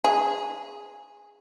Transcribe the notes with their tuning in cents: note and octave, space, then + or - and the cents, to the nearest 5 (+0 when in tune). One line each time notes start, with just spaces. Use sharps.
G#4 -10